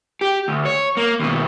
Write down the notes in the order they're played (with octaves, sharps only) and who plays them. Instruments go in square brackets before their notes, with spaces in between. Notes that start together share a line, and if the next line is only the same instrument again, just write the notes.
[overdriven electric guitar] G4
D2
C#5
A#3
D#2 B2